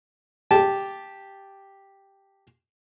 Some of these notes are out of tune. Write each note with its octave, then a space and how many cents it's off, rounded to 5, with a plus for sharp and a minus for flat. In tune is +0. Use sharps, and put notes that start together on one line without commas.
G4 +0 A5 -10